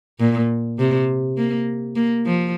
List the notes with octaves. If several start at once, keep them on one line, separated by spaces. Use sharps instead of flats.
A#2
C3
A#3
A#3
F3